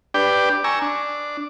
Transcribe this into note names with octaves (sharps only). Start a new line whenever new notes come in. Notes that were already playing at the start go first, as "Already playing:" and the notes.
D4 G4 B4 D5 G5
G#5 A#5 C#6 E6
D4